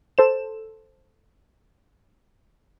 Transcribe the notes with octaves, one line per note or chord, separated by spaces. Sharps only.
A4 C5 E7